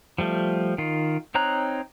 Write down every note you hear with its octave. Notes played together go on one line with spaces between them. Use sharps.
F3 G3 A3
D#3 F4
C4 D#4 C#5 A#5 F#6